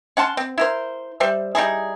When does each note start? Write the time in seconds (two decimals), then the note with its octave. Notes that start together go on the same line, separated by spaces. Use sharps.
0.17 C#4 F#5 A5 C6
0.37 C4
0.58 E4 A#4 C5
1.20 G3 C5 E5
1.55 G3 D#4 E4 G#4